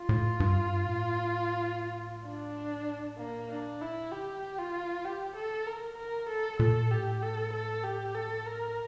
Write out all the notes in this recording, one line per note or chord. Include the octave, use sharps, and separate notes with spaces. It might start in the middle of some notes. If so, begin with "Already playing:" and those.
Already playing: F4
A2
G2
A2
D4
A#2 A#3
D4
E4
D3 G4
F4
G4
A4
A#4
C#3 A#4
A#2 A4
A#2 A4
A2 G4
A4
A4
G4
A4
A#4